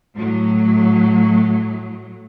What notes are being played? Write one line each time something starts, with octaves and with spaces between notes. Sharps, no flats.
A2 F#3